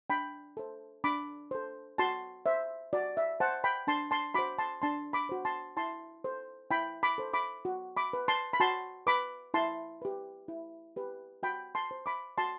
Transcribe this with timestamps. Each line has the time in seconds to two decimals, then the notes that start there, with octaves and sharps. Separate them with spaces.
0.10 D4 G5 B5
0.57 A4 C5
1.04 D4 B5 D6
1.51 A4 C5
1.98 F#4 A5 C6
2.46 C5 E5
2.93 F#4 D5
3.17 E5
3.40 C5 F#5 A5
3.64 G5 B5
3.87 D4 A5 C6
4.11 A5 C6
4.34 F#4 C5 B5 D6
4.58 A5 C6
4.82 D4 A5 C6
5.13 B5 D6
5.29 F#4 C5
5.45 A5 C6
5.77 E4 A5 C6
6.24 A4 C5
6.71 E4 G5 B5
7.03 B5 D6
7.18 A4 C5
7.34 B5 D6
7.65 F#4
7.97 B5 D6
8.13 B4
8.28 A5 C6
8.53 B5
8.60 F#4 A5 C6
9.07 B4 B5 D6
9.54 E4 A5 C6
10.02 G4 B4
10.48 E4
10.96 G4 B4
11.43 F#4 G5 B5
11.75 A5 C6
11.91 C5
12.06 B5 D6
12.38 F#4 A5 C6